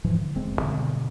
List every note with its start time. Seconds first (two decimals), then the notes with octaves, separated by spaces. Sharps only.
0.04 G#2 E3 F3
0.18 D3
0.36 E1 G#3 C4
0.61 G2 B2 D3